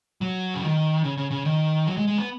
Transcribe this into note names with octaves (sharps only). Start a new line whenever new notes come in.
F#3
C#3
D#3
C#3
C#3
C#3
D#3
F#3
G#3
G#3
B3